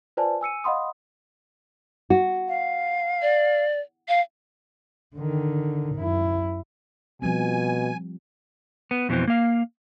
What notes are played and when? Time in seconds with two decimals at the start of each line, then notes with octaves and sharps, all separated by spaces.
0.17 F4 B4 C5 D5 G#5 A5
0.41 G#5 E6 C#7 D#7
0.64 D#5 F5 F#5 B5 C6 D#6
2.10 F#4
2.49 F5
3.22 D5
4.08 F5
5.16 D3 D#3
5.96 F#2 E4
7.22 B2 F3 G3 C4 G#5
8.91 B3
9.09 F2 B2 D3 E3 C4
9.28 A#3 F5